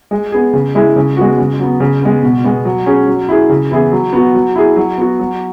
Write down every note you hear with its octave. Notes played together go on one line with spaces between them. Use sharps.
G#3
B3 G#4
C#3
G#3 E4 G#4
C#3
G#3 B3 F#4
C#3
F#3 B3
C#3
G#3 B3
B2
G#3 B3
F#3
C#4 G#4
F#3
E4 G#4
C#3
E3 B3 E4 G#4
F#3
B3 F#4
F#3
E4 G#4
F#3
B3 F#4
F#3